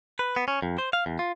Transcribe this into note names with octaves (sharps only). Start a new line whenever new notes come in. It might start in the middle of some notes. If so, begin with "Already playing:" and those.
B4
B3
C#4
F2
C5
F5
E2
F4